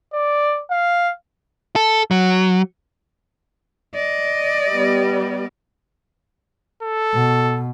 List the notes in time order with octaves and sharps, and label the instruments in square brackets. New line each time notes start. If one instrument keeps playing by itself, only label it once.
[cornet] D5
F5
[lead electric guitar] A4
F#3
[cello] D5 D#5
[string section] G3 B3
[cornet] A4
[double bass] B2